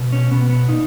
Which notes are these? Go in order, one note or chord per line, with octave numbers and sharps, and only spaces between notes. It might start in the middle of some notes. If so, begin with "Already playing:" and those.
Already playing: B2
C#4
B2 B3
B3
A#2 D#4